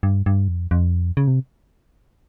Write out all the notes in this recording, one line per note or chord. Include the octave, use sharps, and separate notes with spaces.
G2
G2
F2
F2
C#3
C3